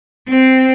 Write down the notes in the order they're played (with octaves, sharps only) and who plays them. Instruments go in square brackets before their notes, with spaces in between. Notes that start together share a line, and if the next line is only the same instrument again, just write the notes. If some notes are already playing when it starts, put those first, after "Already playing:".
[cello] C4